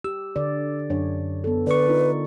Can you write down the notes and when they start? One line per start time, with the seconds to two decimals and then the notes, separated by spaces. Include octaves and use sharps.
0.04 G4 E6
0.36 D3 D5
0.90 F#2 D4 C#5
1.44 B3 A4
1.67 D3 B4 D5 C#6
1.86 D#4 F4 A#4